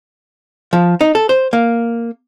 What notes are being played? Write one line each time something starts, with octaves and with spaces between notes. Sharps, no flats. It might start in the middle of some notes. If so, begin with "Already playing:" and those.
F3
D#4
A4
C5
A#3